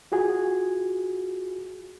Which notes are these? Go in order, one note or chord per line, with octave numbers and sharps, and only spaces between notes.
F4 F#4 G#4 G#5